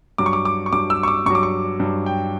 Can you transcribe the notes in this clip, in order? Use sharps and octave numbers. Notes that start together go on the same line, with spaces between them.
G2 F#3 D6
C#6
D6
D6
C#6
G2 F#3 D6
E6
C#6
D6
G2 F#3 C#6
D6
C#6
G2 F#3
G5